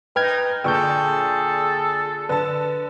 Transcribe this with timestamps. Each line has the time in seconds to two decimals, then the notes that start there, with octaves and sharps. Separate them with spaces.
0.16 D#4 B4 G5 F6 G#6
0.64 A#2 D3 G#4 A4 G5 C#6 G6
2.29 D3 B4 A5